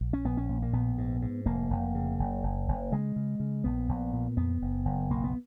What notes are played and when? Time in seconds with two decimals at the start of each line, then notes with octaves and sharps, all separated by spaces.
0.01 A#1
0.13 C#4
0.25 A#1 B3
0.37 C#4
0.49 A#2
0.62 A#3
0.73 A#1 B3
0.98 G#2
1.22 G#2
1.46 F1 A#3
1.70 F1
1.95 C#3
2.19 F#1
2.43 F#1
2.68 F#1
2.92 C#3 G#3
3.16 C#3
3.40 C#3
3.64 A#1 B3
3.89 A#1
4.13 A#2
4.37 F2 B3
4.62 F#1
4.85 F#1
5.10 B1 A#3
5.24 B3